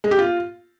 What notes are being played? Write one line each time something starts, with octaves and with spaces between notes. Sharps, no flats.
G#3
G4
F4